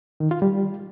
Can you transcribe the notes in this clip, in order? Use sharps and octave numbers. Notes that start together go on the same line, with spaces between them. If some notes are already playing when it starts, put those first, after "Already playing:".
D#3
F4
G3